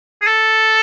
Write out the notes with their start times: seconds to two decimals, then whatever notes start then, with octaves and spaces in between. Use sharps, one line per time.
0.21 G#4
0.27 A4